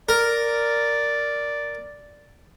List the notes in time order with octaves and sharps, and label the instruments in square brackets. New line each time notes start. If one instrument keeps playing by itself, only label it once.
[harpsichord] A#4 [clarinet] D5